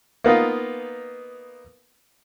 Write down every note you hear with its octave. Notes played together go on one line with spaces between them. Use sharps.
A#3 B3 D#4 F4